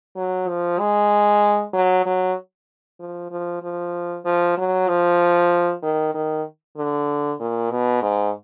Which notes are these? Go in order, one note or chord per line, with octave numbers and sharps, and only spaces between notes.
F#3
F3
G#3
F#3
F#3
F3
F3
F3
F3
F#3
F3
D#3
D#3
D3
A#2
B2
G#2